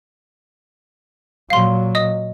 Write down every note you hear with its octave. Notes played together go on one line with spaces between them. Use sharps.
A#2 F#3 F5 C6
D#5 D#6